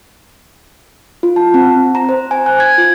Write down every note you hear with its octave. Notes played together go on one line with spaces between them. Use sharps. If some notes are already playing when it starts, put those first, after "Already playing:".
F4
A5
C4
A#5
C5
G#5
F#6
G#6
F4